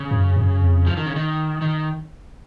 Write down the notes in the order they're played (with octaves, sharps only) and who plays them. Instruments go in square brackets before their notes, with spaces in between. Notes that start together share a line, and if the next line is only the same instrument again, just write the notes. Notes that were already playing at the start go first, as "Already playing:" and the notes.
Already playing: [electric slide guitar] C#3
[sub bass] F#2
F#2
F2
[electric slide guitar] F3
D#3
C#3
D#3
D#3